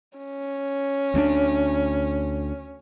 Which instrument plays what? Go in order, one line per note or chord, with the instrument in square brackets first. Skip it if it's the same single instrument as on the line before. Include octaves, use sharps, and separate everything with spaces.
[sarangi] C#4
[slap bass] D2 A#3 D4